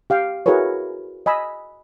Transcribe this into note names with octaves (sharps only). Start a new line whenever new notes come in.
G4 F5 G5
E4 F#4 G#4 A#4 B4 C#5
D#5 G#5 B5 E6